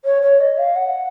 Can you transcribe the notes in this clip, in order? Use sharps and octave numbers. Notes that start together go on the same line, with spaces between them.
C#5
C#5
D#5
F5
F#5